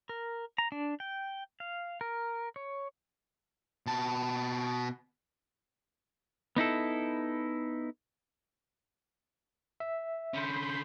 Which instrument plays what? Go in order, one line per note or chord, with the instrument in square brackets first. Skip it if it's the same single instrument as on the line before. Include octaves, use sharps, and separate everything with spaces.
[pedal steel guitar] A#4
A#5
D4
G5
F5
A#4
C#5
[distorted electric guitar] B2 A5
[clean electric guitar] B3 D#4 E4 A4
[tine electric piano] E5
[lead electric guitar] D3 C#4 [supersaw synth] B5 C6 G6